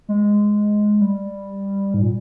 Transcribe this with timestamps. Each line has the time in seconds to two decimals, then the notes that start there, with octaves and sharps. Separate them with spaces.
0.09 G#3
1.01 G3
1.94 G#2
2.02 A#2